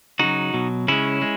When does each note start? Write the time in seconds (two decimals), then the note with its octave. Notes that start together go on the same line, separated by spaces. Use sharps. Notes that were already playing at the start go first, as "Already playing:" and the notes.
0.19 C#3 F#3 D#4 F#4
0.54 B2 F#3
0.88 C#3 G#3 C#4 E4
1.22 G#3